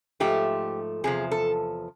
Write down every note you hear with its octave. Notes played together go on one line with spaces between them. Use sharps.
G#2 F3 A3 G4
E2 C3 F3 G#4
A4